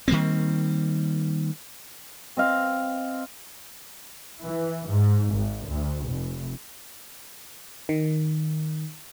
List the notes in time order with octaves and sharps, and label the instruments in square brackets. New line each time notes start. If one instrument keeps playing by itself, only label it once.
[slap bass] D#3 G3 A#3 C4
[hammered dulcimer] C4 D#5 F5
[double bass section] E3
G#2
G#1
D2
F1
[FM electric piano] D#3